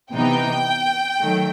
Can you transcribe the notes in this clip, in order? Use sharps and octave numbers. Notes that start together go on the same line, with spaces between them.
C3 E3 B3 D#4 G5
D#3 F#3 A3